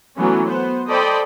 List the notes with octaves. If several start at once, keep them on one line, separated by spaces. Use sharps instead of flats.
E3 F#3 A3 B3 C#4
B3 C5
A4 C5 D5 D#5 G5 B5